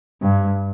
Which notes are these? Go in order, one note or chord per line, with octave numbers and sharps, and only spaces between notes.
G2